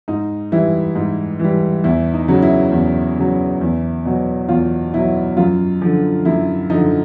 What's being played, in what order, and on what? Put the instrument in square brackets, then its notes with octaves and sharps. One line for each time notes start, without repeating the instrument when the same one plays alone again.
[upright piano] G#2 D#4
E3 G3 E4
G#2
E3 G3
E2 E4
D#4
C#3 F#3
E4
E2
C#3 F#3
E2
B2 F#3
E2 F4
B2 F#3 E4
F#2 F4
D3 F3
F#2 E4
D3 F3 D#4